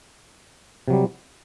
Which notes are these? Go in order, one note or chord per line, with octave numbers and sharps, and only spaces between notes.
C3 F#3 G3